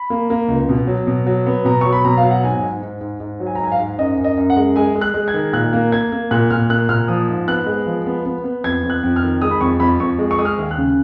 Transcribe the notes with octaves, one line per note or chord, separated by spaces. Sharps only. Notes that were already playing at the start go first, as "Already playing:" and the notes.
Already playing: B5
A#3
A#3
C#2
B2
F#3
B2
F#3
B3
B2 A#5
F#3 C#6
B5
B2 A#5
F5
F#3
F#5
G#2 G#5
G#2
G#2
G#2
G#2
F#3
G#5
A#5
G#2 G#5
F5
G#2
F#2 D#5
F#2
D#5
F#2
F#5
G#3
G#3 G#5
G#3
F#6
G#3
G#6
D#3
A#2 F#6
A#3
A#3 G#6
A#3
A#2 F#6
A#2 F6
A#3 F#6
A#2 F6
F3 D#6
G#2
B3 F#6
G#3
F3
B3
B3
B3
F2 G#6
F2
F#6
F2
F6
D#3
G#3 D#6
B5
F2 C#6
F2 B5
F2 C#6
G#3
C#6
G#3 D#6
F6
D#2
F#6
C#3